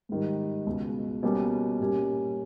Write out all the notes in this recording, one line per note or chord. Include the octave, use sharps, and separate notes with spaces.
G#2 D#3 G3
C#2 B2 G#3
B2 G3 A#3 C#4 G4
A#2 G3 A#3 C#4 G4